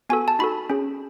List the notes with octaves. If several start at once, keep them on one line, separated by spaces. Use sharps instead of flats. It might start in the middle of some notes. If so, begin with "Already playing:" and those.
B3 F#4 A4 G#5
A5
D#4 F#4 A4 B5
C#4 G#4